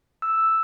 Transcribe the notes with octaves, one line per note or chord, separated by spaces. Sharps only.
E6